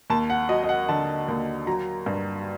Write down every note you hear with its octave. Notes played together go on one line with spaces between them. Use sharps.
D#2 A5
F#5
F#3 D#5
D#5
F#5
D3 A5
D#2
F#3 A#5
G2